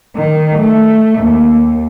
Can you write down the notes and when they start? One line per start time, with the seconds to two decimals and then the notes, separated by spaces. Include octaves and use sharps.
0.16 D#3
0.58 A3
1.19 D#2